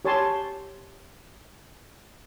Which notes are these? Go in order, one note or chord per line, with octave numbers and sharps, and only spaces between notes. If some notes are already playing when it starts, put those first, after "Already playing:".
G4 C#5 G#5 A5 C6